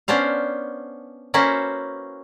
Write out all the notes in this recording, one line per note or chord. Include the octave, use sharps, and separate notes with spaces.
B3 C#4 D4 C5 F5
A#3 C#4 E4 F#4 B4 C5